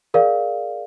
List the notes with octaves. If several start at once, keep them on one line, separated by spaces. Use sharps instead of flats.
G#4 A#4 D5 F5